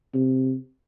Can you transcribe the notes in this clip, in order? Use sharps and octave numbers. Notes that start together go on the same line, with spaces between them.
C3